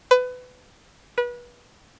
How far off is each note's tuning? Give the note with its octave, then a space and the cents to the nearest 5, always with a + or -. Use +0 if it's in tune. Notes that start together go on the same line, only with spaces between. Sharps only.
B4 +25
B4 -30